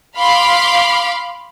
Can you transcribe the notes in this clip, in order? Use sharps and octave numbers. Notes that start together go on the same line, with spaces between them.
F5 B5 C6 D6 F6